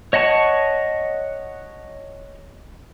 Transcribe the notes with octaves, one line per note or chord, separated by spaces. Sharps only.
C#5 D#5 F#5 A5 C#6